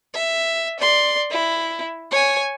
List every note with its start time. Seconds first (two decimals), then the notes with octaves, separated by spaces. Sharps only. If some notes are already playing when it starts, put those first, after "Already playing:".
0.14 E5
0.79 D5 C6
1.31 E4
2.11 C#5 G#5